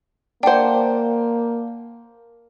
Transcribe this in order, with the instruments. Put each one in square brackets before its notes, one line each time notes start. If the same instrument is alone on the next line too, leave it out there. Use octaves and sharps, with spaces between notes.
[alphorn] A#3 [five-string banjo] D4 C5 [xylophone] F#5 G5